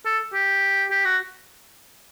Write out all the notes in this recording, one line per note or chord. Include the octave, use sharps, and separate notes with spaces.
A4
G4
G4
F#4